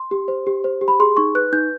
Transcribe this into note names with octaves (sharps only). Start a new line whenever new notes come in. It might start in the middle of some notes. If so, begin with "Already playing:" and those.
Already playing: C6
G4
C5
G4
C5
G4
B5
G#4 C6
D#4 C#6
B4 F#6
D#4 G6